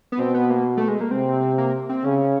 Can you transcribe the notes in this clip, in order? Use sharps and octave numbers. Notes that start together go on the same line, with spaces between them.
B3
B2 C4
B3
A#3
A3
G#3
A#3
C3 C4
A#3
C4
C#3 C#4